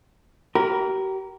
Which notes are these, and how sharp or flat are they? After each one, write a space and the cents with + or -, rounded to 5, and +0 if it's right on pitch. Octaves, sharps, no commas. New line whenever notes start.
G4 -40 A#4 +5 B5 +0